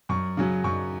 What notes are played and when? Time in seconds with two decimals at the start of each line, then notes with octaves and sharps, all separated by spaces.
0.09 F#2 C#6
0.37 C#3 F#3 C#4
0.64 F#2 C#6